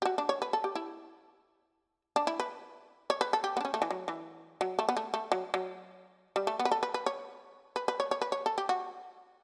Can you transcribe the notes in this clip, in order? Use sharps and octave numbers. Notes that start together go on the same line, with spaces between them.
G4
F#4
D4
C#5
B4
A4
G4
E4
D4
E4
B4
C#5
B4
A4
G4
B3
D4
C#4
A3
E3
F#3
E3
F#3
A3
B3
A3
A3
F#3
F#3
G3
A3
B3
B4
A4
B4
B4
C#5
B4
B4
C#5
C#5
B4
C#5
A4
G4
F#4